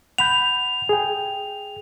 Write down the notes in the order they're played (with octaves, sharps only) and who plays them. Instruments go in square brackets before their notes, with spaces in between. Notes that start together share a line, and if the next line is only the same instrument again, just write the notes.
[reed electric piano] F#5 B5 G6 [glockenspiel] F7
[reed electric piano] G#4 G5